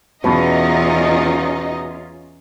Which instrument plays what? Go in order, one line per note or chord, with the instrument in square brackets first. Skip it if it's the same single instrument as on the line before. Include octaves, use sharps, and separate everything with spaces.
[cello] E2 [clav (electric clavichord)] B2 [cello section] C#4 F4 [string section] D#4 D#5